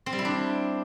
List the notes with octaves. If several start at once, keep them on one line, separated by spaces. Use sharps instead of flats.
C4
G3
E4
D4